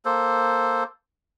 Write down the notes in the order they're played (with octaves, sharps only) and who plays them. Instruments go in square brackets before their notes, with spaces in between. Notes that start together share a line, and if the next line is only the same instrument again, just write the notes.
[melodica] A#3 A4 C5